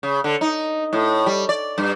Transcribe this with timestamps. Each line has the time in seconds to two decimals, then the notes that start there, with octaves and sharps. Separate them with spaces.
0.03 C#3
0.24 D3
0.41 D#4
0.93 A2
1.26 G3
1.49 D5
1.78 G2